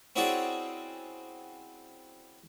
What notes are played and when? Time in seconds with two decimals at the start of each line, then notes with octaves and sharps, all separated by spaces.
0.16 C4 C#4 E4 F#4 G#4 D5